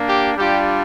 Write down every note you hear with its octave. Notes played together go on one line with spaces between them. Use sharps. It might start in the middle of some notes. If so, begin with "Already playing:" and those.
Already playing: A#3 D4
G4
G3 D4 F4 G4